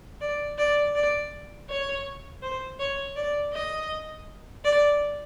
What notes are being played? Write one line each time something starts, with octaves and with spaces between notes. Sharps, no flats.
D5
D5
D5
C#5
C5
C#5
D5
D#5
D5